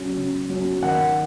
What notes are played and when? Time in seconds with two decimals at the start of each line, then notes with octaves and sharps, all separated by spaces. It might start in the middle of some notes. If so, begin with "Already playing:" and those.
Already playing: C#3 F#3 C#4
0.17 C#3
0.50 F#3 C#4
0.83 D#3 F#5